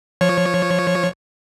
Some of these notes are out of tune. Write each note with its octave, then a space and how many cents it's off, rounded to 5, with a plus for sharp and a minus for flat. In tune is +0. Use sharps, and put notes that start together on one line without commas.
F3 +0 C#5 -10